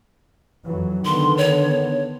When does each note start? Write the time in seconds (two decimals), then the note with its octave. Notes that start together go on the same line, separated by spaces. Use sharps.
0.64 F2 E3 F#3
1.05 D3 D#3 B3 C6
1.38 C#5